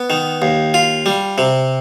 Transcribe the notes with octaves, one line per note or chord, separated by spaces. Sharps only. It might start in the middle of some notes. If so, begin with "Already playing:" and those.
Already playing: B3
D#3
D#2
F4
G3
C3